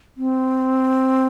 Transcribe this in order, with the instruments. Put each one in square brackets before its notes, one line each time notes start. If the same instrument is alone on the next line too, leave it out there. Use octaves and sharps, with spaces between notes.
[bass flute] C4